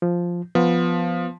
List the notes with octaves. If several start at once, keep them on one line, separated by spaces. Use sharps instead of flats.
F3
F3 B3